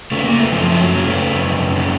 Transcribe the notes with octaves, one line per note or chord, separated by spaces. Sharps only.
C#3 A3
A#3
A3
F#2 F3
A3
F#3
C#3
A3
F#2
C#3